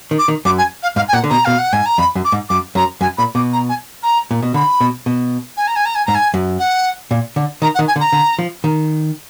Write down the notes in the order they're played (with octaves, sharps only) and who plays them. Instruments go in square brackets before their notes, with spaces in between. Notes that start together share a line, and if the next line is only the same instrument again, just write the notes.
[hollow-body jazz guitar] D#3
[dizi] D6
[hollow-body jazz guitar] D#3
[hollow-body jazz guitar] F#2 [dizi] D6
[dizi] G#5
F5
[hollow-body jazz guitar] G#2 [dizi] F5
[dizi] G#5
[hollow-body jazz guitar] A#2 [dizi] F#5
[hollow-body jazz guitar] D3
[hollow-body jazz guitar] B2 [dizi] A#5
[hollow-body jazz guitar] B2 [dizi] F5
[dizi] F#5
[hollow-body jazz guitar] G#2 [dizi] G#5
[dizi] A#5
[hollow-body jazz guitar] F2 [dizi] B5
[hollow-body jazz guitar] F#2
[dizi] D6
[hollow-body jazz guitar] G#2
[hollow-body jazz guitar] F#2 [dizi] D6
[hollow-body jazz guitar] F#2 [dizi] A#5
[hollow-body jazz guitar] F#2 [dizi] G#5
[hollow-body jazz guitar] A#2 [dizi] B5
[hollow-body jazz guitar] B2 [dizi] D6
[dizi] A#5
G#5
A#5
[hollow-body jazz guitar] A#2
B2
[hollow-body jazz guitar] D3 [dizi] B5
[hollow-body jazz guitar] B2
B2
[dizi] G#5
A#5
G#5
A#5
G#5
[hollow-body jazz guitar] G#2 [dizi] A#5
[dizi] G#5
[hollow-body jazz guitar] F#2
[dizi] F#5
[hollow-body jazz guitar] A#2
D3
[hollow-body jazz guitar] D#3 [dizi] A#5
[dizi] F#5
[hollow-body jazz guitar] D#3
[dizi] G#5
[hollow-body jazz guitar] D3
[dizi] A#5
[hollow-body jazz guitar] D3
F3
D#3